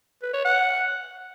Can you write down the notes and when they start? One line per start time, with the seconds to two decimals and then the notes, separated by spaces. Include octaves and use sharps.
0.22 B4
0.33 C#5
0.45 F#5